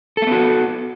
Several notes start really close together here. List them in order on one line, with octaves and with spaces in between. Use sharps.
A4 A#3 B3 F#4